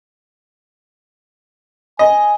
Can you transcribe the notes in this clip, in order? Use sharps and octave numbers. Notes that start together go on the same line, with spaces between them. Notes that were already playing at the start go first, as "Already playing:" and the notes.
D#5 G#5